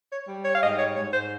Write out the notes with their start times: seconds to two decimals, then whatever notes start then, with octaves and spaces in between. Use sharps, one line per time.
0.10 C#5
0.27 G3
0.45 C#5
0.54 F5
0.62 G#2 D#5
0.79 C#5
0.96 G#2 C#5
1.13 C5